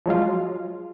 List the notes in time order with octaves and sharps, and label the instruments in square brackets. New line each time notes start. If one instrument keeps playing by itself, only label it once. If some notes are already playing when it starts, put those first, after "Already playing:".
[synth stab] F3 F#3 G#3 F4